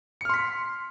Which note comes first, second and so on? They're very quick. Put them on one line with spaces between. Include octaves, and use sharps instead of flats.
C#7 F6 C6 B6